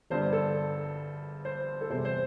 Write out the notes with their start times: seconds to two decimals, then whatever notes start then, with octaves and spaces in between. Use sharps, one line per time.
0.10 G1 G2 D3 G3 C5
0.33 A4
1.45 C5
1.81 A4
1.90 E2 C3 E3 G3 C5
2.05 C5